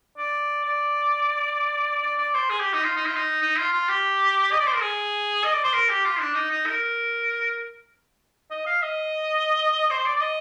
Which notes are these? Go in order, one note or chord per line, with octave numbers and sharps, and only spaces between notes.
D5
D5
D5
D5
C5
G#4
G4
D#4
F4
D#4
F4
D#4
D#4
F4
F4
G4
D#5
D5
C5
A#4
G#4
D#5
D5
C5
A#4
G4
F4
D4
D#4
D#4
A#4
D#5
F5
D#5
C5
D5
D5
D#5